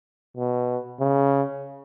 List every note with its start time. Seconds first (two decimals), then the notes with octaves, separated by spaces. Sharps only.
0.37 B2
1.00 C#3